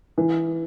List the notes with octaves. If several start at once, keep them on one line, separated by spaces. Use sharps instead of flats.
E3